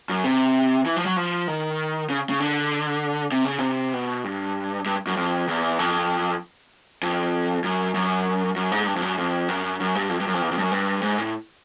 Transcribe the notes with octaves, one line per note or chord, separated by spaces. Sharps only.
F#2
C3
E3
F3
F#3
F3
D#3
C#3
C#3
D3
C3
C#3
C3
B2
G2
G2
F#2
F2
E2
F2
F2
F#2
F#2
F#2
G#2
G2
F2
F#2
F2
F#2
F#2
G2
F2
G2
F#2
F2
E2
F2
G2
F#2
G2
G#2
A2